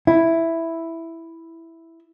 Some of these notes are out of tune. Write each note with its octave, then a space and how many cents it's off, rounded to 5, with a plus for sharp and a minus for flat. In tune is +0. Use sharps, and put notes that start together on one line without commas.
E4 +0